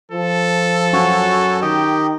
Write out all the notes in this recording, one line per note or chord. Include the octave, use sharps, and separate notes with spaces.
F3 A4
F#2 F#4 C#5 G#5
D#3 G4 D#5 G5